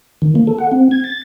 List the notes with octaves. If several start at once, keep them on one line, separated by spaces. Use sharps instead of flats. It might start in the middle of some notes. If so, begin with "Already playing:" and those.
D#3
A#3
A4
F#5
C4
G#6
A6